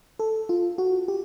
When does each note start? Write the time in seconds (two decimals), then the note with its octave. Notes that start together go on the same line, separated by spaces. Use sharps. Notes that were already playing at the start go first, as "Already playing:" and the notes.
0.19 A4
0.49 F4
0.78 F#4
1.08 G4